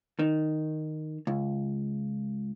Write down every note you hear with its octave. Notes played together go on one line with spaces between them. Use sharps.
D#3
C#2